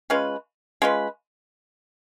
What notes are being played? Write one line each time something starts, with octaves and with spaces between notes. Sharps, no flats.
G#3 C#4 F4 B4
G#3 C#4 F4 B4